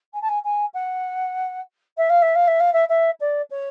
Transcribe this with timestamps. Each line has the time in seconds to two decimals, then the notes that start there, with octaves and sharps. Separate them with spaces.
0.13 G#5
0.21 A5
0.29 G#5
0.44 G#5
0.74 F#5
1.97 E5
2.09 F5
2.22 E5
2.35 F5
2.47 E5
2.60 F5
2.73 E5
2.89 E5
3.20 D5
3.50 C#5